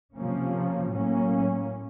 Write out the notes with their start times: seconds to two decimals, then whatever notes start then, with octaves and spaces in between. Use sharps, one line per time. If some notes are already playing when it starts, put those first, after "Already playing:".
0.15 C3 F3 A#3 C#4
0.90 A2 F#3 A#3 C#4